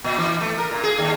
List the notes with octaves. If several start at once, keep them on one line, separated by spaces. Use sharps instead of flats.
A#2
E3
A3
A#4
A#2
G#4
D#2